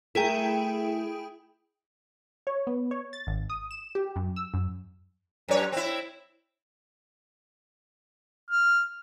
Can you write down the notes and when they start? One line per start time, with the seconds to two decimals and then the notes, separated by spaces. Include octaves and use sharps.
0.15 A3 E4 G#4 A#4 G5
2.47 C#5
2.67 B3
2.91 C#5
3.13 A6
3.27 G#1
3.50 D#6
3.71 E7
3.95 G4
4.16 F#2
4.36 E6
4.54 F#2
5.48 F#2 C#5
5.72 C4 E4
8.51 F6